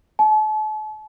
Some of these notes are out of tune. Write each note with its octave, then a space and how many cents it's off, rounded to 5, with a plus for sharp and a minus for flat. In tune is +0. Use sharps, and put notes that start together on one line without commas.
A5 -40